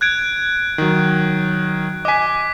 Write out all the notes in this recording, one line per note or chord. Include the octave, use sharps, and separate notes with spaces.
F#6 G#6 D7
D#3 F#3
D#5 G#5 D6 B6